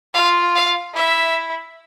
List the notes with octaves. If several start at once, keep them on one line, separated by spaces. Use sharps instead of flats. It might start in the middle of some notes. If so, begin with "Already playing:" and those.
F4 F5
F5
E4 E5